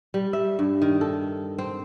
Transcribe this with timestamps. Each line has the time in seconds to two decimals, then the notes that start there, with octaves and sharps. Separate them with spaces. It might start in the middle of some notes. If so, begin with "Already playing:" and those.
0.14 G3
0.33 E5
0.59 G2
0.82 D#3
1.01 A4
1.58 C4